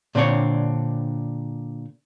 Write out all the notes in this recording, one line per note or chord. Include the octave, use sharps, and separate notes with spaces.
A#2 D3 C4 D4 C#5